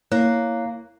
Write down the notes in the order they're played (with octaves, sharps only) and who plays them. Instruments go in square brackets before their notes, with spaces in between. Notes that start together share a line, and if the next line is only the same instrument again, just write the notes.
[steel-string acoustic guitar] A#3 [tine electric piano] E4 C#5 F#6